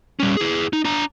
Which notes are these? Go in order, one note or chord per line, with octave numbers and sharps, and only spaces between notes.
G3 C#4
E4 G#4
D#4
D4 A#5